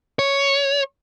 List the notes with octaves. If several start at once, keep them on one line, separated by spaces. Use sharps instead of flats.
C#5